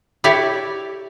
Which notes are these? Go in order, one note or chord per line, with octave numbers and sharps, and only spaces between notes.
E4 G4 C#5 D5 E5